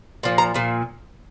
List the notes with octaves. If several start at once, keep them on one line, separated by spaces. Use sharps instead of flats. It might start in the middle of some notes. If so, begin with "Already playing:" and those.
A#2 F3
A#5
A#2 F3